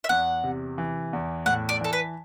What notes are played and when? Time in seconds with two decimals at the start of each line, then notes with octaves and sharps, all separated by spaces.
0.04 E5
0.09 E2 F#5
0.44 C3
0.78 E3
1.13 E2
1.46 A2 F#5
1.69 D5
1.81 E3 A4
1.93 B4